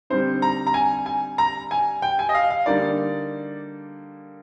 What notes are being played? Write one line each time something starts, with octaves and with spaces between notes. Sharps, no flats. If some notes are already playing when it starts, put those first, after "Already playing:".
D3 G3 C4 D#4 C5
A#5
A#5
G#5
G#5
A#5
G#5
G5
G#5
D#5
F5
F5
D3 G3 A#3 D#4 D5